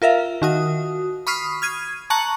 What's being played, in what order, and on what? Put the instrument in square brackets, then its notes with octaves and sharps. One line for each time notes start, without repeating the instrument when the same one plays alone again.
[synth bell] F4 A#4 E5 F5
D#3 F#4 D#6
B5 C#6 D#6 F6 B6 C7
F6 G#6 D#7
A5 A#5 C#6 F#6 C#7 F#7